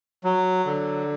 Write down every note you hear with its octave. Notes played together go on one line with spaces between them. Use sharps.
F#3
D3